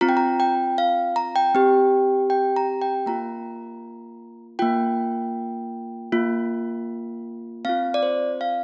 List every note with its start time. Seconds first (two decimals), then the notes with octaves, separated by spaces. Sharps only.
0.01 C4 F4 A#5
0.09 G5
0.17 A#5
0.40 G5
0.78 F5
1.16 A#5
1.36 G5
1.55 C4 G4
2.30 G5
2.56 A#5
2.82 G5
3.06 A#3 F4 A#5
4.59 A#3 F4 G5
6.12 A#3 F4
7.65 C4 F4 F5
7.94 D5
8.03 C5
8.41 F5